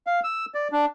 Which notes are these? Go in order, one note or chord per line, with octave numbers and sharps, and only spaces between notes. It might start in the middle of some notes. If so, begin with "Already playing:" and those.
F5
E6
D5
D4